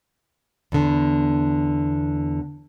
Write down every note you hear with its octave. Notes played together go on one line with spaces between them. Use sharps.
E2 D3